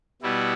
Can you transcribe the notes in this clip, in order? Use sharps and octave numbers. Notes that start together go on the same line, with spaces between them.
B2 G3 B3 E4